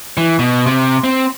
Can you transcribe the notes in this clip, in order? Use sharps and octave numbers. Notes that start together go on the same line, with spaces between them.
E3
B2
C3
C4